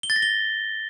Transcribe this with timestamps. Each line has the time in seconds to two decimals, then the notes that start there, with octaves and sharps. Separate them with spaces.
0.03 G7
0.10 A6
0.16 A#6
0.22 G7